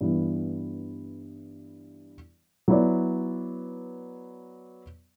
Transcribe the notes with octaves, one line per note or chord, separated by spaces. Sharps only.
G2 E3 B3 E4
F#3 B3 E4 B4 D5